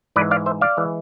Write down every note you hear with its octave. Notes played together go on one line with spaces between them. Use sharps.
G#2 E3 G#3 B4 D5
D5 F5
C5 E5
D5 F5
E3 G#3